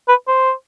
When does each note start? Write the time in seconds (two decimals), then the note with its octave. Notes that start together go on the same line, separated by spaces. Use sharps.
0.08 B4
0.28 C5